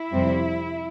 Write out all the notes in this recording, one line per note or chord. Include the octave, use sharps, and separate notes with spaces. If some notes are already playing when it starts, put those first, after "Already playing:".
Already playing: E4
F2 C3 G3 C4